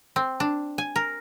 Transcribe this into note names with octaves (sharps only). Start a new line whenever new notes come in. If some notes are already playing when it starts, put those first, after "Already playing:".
C4
D4
G#5
A#4